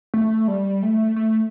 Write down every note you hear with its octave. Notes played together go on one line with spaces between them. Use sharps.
A3
G3
A3
A3